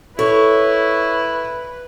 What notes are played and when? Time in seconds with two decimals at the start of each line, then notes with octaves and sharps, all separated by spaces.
0.19 E4 A4 B4 C#5